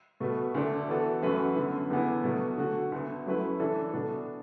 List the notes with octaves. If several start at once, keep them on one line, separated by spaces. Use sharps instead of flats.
B2 A3 F#4 B4
D2 D3 A3 D4
E3 B3 F#4 A4
F#2 E3 A3 F#4 B4
F#2 D3 B3
E2 D3 B3 E4
B2 F#3 A3 F#4
D3 A3 F#4
D2 D3 B3
F#2 F#3 A3 E4 B4
E3 D4 A4
B2 B3 D4 A4